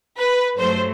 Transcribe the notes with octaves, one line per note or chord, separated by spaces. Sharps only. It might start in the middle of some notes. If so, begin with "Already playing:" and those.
B4
G2 F#3 A3 C5